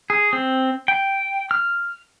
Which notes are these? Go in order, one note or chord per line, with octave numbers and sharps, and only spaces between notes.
G#4
C4
G5
F6